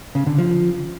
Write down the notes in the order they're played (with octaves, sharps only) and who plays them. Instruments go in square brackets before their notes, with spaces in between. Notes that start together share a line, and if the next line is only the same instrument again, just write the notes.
[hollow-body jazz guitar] C#3
D3
F3